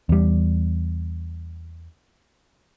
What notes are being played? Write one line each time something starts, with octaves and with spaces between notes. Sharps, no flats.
E2 G3